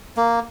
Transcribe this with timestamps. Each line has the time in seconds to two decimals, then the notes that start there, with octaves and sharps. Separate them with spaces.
0.17 A#3